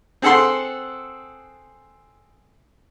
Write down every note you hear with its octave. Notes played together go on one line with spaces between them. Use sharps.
C4 G#4 A4 F#5 C6